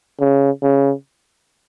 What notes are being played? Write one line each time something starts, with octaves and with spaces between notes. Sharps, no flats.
C#3
C#3